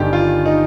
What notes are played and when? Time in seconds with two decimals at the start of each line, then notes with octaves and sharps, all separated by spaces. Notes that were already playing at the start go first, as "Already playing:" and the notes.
Already playing: G1 G2 D#3 G4
0.13 F4
0.45 D#4